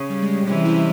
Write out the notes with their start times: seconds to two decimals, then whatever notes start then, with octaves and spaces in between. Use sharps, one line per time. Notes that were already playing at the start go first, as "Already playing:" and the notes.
Already playing: C#3
0.10 G3
0.22 G#3
0.47 C3 E3 C#4
0.65 E4